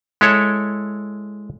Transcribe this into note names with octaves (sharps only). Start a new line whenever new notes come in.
G#3 E4 A4 C#5